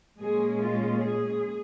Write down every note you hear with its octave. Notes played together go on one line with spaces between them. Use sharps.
A#2 G#3 C#4 G#4
F4
G#4